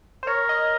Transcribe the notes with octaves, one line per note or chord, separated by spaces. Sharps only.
C5
A#4 C#5
D#5